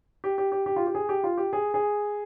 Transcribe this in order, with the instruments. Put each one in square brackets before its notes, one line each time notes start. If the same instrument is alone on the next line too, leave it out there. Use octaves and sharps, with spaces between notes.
[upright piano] G4
G4
G4
G4
F4
G4
G#4
G4
F4
G4
G#4
G#4